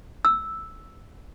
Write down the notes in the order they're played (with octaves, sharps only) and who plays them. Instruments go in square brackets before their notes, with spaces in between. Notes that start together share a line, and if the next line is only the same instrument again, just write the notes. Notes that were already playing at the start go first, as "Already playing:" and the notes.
[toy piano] E6